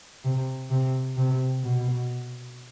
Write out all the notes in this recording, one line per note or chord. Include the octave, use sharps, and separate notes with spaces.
C3
C3
C3
B2